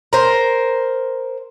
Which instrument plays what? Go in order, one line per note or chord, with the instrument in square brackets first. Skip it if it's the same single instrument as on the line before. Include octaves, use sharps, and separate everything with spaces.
[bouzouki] A#4 C5